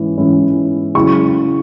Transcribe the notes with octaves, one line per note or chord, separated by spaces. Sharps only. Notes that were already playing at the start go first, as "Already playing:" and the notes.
Already playing: G#2 E3 C#4 E4
G#2 E3 C#4 E4
C#3 F#3 E4 C#6